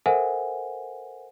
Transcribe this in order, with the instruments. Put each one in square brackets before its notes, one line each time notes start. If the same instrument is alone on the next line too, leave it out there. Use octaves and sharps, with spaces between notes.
[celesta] A4 A#4 C5 E5 F#5 G#5